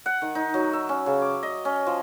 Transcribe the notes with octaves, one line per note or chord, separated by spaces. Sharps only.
F#5
D#3
D#4
F#3
E5
C#4
C#3
D6
D#5
C#4
F3